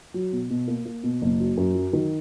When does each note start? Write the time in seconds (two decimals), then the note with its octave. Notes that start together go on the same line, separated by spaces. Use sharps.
0.14 F#3
0.33 B2
0.50 B2
0.68 A#3
0.85 A#3
1.04 B2
1.22 F#1
1.39 F#3
1.57 F#2
1.75 F#3
1.93 D#3